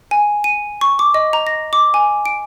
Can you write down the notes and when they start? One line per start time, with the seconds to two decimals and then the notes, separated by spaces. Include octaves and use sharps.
0.11 G#5
0.44 D#7
0.81 C#6
0.99 D6
1.14 D#5
1.33 A#5
1.47 A#6
1.73 D6
1.94 G#5
2.26 D7